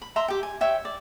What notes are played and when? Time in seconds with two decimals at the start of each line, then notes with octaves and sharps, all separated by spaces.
0.02 B5
0.16 E5 A#5 C6
0.28 G4 G5
0.43 G#5
0.61 C#5 E5 G5
0.85 D5